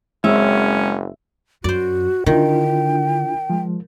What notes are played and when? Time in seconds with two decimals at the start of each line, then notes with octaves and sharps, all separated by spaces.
0.24 F#1 G#3 C4 C#4 E5
1.64 F#2 F#4 C5 D5
2.26 D3 D#3 D4 E4 F4 G5
3.50 F3 G#3